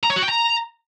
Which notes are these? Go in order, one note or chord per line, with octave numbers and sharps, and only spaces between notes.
A#5
C#5
F#4
G5
A#5